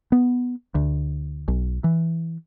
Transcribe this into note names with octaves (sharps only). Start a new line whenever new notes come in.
B3
D2
B1
E3